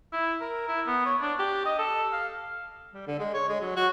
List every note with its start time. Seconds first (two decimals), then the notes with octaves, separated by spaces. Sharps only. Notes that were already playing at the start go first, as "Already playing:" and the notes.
0.13 E4
0.41 A#4
0.69 E4
0.87 B3
1.06 C#5
1.21 D4
1.39 G4
1.66 D#5
1.79 A4
2.13 F5
2.94 G3
3.07 D3
3.19 G#3
3.34 C#5
3.49 G#3
3.61 F#3
3.76 F#4